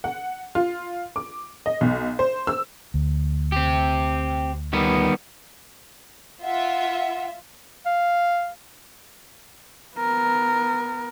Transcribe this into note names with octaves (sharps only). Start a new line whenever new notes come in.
F#5
F4
D6
D#5
B1
C5
E6
D2
C4 G4
D#3 G3 B3
F4 E5 F#5
F5
B3 A#4